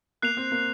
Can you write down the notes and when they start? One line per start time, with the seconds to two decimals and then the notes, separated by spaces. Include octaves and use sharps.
0.22 A#3 F#6 C7 F7
0.37 C4
0.52 A#3